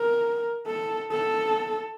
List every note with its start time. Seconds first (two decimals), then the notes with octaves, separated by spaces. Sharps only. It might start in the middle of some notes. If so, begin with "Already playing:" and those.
Already playing: A#4
0.67 A4
1.11 A4